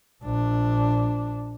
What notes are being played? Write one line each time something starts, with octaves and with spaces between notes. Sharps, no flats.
A#1 D4